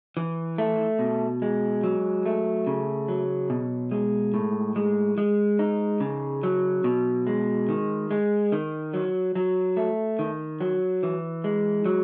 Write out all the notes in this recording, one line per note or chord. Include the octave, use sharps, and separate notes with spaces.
E3
A3
B2
G#3
F#3
A3
C#3
F#3
B2
G#3
A2
G#3
G#3
D#4
C#3
F#3
B2
G#3
D#3
G#3
D#3
F#3
F#3
A3
D#3
F#3
E3
G#3
F#3